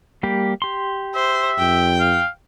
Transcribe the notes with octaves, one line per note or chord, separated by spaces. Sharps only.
G3 A#3 G4
G4 C6
C5 E5
F2 G5
F5